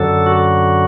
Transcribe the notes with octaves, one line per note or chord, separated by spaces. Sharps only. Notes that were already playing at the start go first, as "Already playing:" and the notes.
Already playing: F#2 D3 F#3 A4
F#4